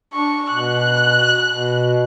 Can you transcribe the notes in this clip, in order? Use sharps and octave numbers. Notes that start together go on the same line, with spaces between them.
D4 C#6
B2 F#6
B2